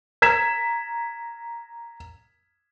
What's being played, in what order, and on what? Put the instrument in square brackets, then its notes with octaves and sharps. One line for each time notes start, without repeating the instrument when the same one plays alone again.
[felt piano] A#5 G#6 B6 E7